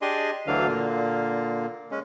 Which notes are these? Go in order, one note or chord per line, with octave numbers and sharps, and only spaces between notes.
D4 G4 G#4 D#5 G#5 C6
D2 D3 E3 F#3 D4 F5
A#2 D3 A#3
G#3 C#4